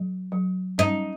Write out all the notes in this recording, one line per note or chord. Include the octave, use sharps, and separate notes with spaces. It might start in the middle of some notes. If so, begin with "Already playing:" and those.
Already playing: F#3
F#3
C#4 D#4